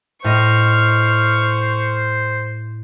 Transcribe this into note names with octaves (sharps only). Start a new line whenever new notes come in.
A2 C5 D#5 C#6 F6